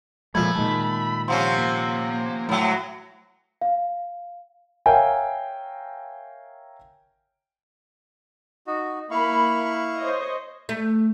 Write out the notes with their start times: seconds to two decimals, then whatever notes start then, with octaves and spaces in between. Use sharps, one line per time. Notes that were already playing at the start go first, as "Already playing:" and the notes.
0.35 A#2 F3 G#3 A3 B5 G#6
0.55 A#2 D#3 G#3 A5
1.28 C3 F3 C#4 F5 F#5 C6
1.58 A#3
2.49 A2 F#3 A3
3.61 F5
4.86 A#4 C#5 E5 F5 G5 G#5
8.67 D#4 F#4
9.11 A#3 E4 F5 B5 C#6
9.99 C5 C#5 D#5
10.69 A3